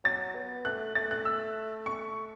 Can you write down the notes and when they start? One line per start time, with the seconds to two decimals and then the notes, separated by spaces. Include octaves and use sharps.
0.04 F#3 A6
0.35 B3
0.65 A3 F#6
0.95 A3 A6
1.11 F#6
1.25 E6
1.86 C#6